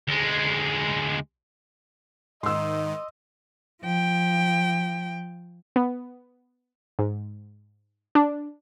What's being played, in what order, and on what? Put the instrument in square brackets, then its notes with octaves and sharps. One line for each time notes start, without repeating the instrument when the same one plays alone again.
[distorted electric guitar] D2 G#3
[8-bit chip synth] G#2 D#3 [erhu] D#5 [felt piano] C6 E6
[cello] F3 G5
[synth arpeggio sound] B3
G#2
D4